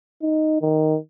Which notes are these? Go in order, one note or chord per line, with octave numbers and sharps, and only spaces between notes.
D#4
D#3